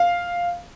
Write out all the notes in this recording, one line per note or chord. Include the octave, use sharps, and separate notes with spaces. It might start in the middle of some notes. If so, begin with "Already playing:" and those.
Already playing: F5